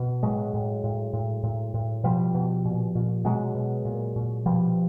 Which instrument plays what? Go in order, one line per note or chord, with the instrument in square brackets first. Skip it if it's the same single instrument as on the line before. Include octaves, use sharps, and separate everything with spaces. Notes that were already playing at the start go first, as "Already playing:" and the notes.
Already playing: [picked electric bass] B2
A2 F#3 G#3
A2
A2
A2
A2
A2
B2 F3 G3
B2
A#2
A#2
B2 F#3 G#3
B2
A#2
A#2
B2 F3 G3